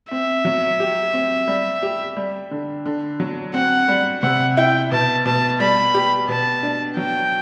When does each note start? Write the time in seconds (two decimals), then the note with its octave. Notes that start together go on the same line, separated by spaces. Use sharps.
0.11 C4 E5
0.45 F#3
0.80 G4
1.13 C4
1.48 G3
1.82 G4
2.17 G3
2.51 D3
2.86 D3
3.20 F#3
3.54 C4 F#5
3.88 G3
4.22 C3 F#5
4.57 E4 G5
4.92 B2 A5
5.26 B2 A5
5.60 G3 B5
5.94 G4
6.28 B2 A5
6.63 D4
6.97 F#3 G5